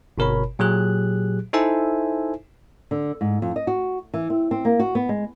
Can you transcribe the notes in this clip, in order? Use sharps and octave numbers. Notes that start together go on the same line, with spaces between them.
G1 B2 A#4 C#5 B5
A#2 F#3 G4 G#4 F#6
D#4 E4 A4 C5 E5 G#5
D3
G#2
F2
D#5
F#4
E3
C4
C4
A#3
F#4
B3
G#3